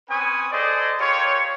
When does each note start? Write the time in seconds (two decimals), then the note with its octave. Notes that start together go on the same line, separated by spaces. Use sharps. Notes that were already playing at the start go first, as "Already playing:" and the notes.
0.10 C4 C#4 B4 G#5 C#6 D#6
0.52 G#4 A4 C5 D5 D#5
1.00 F4 G4 A#4 C#5